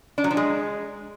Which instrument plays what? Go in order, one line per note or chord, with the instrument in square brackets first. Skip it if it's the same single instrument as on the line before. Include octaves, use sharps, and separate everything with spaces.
[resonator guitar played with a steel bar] D4
F#3
F3
G#3